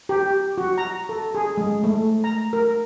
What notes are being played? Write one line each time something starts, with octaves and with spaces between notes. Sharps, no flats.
G4
F#4
A#5
A4
G#4
G#3
A3
A#5
A#4